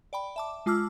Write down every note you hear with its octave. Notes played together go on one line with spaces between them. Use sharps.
D5 G5 B5
E5 A5 D6
G#3 F4 A5 D6 E6 F6